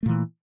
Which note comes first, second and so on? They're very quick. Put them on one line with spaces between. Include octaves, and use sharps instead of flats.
A3 A#2 E3